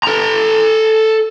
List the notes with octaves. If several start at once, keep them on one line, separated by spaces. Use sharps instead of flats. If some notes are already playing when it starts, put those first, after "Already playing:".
A4 A#5